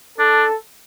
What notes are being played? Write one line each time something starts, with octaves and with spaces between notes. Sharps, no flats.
D4 A4